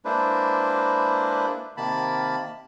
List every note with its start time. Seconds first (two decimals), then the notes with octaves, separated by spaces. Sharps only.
0.05 G#3 A#3 D4 E4 B4 C5
1.77 C3 D#3 A#3 A5 B5